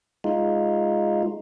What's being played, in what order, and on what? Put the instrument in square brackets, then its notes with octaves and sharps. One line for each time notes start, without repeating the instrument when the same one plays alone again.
[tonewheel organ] G#3 D#4 F4